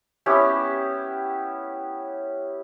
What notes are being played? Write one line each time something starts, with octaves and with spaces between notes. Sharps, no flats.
B3 C#4 E4 G4